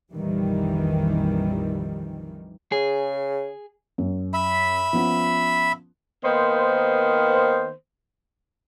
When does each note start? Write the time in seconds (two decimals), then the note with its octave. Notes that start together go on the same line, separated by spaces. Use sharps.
0.12 A#1 F2 D#3 E3 G3
2.72 C#3 G#4
3.98 F#2
4.34 E5 B5
4.93 F3 B3 C#4
6.24 D#3 A#3 B3 C5